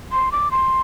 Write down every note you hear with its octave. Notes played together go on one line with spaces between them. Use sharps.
C6
D6
C6